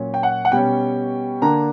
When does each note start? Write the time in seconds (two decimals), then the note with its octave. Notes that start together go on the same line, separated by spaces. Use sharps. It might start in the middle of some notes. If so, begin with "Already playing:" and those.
Already playing: A#2 F#3 C#4
0.14 G5
0.23 F#5
0.45 F#5
0.52 B2 G3 C#4 G5
1.42 D3 A#3 D4 A#5